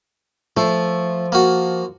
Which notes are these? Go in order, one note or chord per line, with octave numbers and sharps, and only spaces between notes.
F3 A3
A#3 F#4